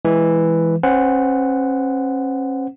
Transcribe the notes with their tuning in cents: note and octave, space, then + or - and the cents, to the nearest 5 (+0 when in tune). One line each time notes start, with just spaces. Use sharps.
E3 +0 G#3 +0
C#4 -40 C5 -35 F#5 +0